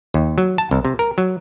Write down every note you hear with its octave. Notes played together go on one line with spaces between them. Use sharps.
D#2
F#3
A5
C2
C3
A#4
F#3